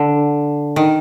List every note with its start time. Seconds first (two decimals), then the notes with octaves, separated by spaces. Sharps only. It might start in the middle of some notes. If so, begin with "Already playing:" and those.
Already playing: D3
0.76 D#3